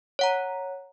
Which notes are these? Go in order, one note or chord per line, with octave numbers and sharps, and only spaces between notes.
C#5 F#5 A#5